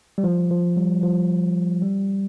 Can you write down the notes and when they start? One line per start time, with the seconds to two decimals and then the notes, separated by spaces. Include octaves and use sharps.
0.18 G3
0.24 F3
0.50 F3
0.77 G3
1.03 F3
1.82 G3